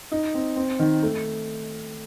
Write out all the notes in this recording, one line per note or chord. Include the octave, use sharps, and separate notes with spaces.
D#4
C4
C4
D#3
A3